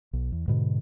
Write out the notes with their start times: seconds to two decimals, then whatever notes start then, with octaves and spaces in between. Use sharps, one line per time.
0.13 B1
0.32 E2
0.48 G#2 B2 D3